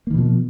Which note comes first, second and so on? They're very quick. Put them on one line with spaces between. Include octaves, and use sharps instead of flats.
A#3 D#3 B2 F3